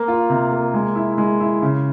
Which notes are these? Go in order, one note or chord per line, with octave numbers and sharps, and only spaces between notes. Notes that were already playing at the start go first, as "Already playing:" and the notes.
Already playing: A#3
F4
C3
A#3
G#3
E4
G#3
E4
C#3